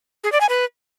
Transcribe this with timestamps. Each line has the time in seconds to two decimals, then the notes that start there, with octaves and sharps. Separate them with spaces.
0.24 G#4
0.32 D5
0.41 G#5
0.49 B4